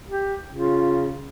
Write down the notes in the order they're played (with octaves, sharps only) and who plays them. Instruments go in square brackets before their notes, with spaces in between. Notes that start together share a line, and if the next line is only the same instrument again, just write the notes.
[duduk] G4
[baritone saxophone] C#3 [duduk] F4